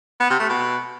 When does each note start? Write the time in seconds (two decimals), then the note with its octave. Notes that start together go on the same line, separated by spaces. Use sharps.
0.20 B3
0.30 C3
0.40 A3
0.49 B2